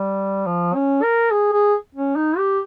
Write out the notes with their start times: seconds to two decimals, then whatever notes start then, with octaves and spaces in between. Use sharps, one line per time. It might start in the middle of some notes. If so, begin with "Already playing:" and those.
Already playing: G3
0.46 F3
0.75 C#4
1.03 A#4
1.31 G#4
1.52 G#4
1.95 C#4
2.16 D#4
2.38 G4